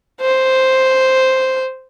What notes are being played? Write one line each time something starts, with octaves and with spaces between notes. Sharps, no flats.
C5